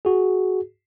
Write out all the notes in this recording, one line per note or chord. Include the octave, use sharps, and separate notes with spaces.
F#4 G#4